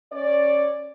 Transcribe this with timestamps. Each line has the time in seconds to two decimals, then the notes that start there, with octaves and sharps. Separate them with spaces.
0.12 C#4 C#5 D5